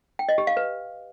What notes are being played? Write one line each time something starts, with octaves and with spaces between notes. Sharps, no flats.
G5
D#5
G4
F5
B4